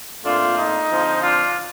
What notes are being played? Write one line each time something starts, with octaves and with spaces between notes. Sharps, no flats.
A#2 A3 C4 D4 F4
D#4
D3 F3 C4
D4 F4